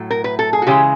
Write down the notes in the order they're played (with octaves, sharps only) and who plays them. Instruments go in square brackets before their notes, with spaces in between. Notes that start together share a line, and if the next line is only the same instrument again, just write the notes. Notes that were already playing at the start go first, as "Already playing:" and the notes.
Already playing: [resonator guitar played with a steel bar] A2 F#3 A3
A#4
B4
A4
G#4
F#4
C#3 E3 G#3 G4